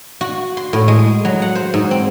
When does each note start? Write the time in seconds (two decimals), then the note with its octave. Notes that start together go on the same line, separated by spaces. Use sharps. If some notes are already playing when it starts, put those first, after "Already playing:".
0.21 F#4
0.57 C6
0.73 A2
0.88 G#3
1.25 F#3
1.42 F#5
1.55 C5
1.74 G#2
1.91 C4